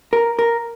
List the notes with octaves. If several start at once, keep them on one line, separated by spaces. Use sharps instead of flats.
A#4
A#4